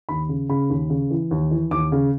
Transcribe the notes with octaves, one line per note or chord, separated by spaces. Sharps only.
D#2 B5
C#3
C#3 B5
D#2
C#3
E3
D#2
E3
D#2 D6
C#3